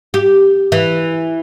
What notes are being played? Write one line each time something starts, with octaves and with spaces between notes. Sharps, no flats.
G4
E3